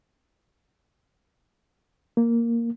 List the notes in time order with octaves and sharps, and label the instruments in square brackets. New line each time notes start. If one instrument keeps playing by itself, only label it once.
[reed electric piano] A#3